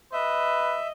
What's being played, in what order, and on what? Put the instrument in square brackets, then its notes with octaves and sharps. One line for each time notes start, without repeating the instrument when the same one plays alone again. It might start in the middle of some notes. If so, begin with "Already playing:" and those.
[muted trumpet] B4 [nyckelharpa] D#5 [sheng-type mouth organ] E5